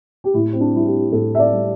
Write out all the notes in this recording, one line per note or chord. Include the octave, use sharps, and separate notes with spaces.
G4
A2 E4
C4
D4
G3 E4
G4
A2 A4
E5
D5
G3